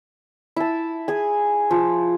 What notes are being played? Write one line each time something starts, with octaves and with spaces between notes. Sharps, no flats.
E4 A5
G#4 G#5
F3